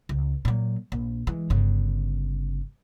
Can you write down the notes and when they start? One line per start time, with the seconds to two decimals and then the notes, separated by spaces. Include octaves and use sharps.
0.09 C#2
0.45 A#2 F#3
0.92 A#1
1.27 E3 G#3
1.50 G1 C#3